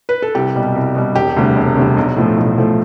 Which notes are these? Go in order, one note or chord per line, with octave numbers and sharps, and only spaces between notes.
B4
A4
C2 G4
B2 G3
C2
B2 G3
E1 G4
D2 C3 G3
E1
D2 C3 G3
B1
A2 F3 A3
B1
A2 F3 A3